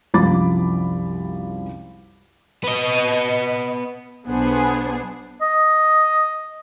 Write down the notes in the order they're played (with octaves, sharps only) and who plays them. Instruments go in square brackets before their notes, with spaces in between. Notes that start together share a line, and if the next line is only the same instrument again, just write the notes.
[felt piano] C2 F#2 F3 B5 D6 A6
[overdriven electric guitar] B3 D#5
[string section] B1 B3 D4 G#4 C5
[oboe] D#5